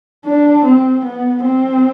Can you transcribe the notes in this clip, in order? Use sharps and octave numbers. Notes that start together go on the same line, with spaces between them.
D4
C4
B3
C4